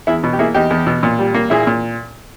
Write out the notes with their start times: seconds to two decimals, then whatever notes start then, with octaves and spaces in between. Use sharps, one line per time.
0.07 E2 E4 G#4
0.24 B2
0.33 G4
0.39 A#3 E4 G#4
0.54 E2 D#4 G4
0.70 E2
0.87 B2
1.03 A#2
1.19 G3
1.34 A#3
1.50 A#2 E4 G#4
1.67 A#2